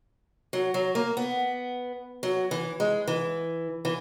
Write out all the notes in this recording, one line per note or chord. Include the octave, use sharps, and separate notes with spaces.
F#3
F#3
A#3
B3
F#3
E3
G#3
E3
E3